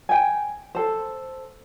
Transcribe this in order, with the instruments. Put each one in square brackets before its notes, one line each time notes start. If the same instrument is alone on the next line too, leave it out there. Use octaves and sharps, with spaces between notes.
[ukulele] G5 G#5
A4 C5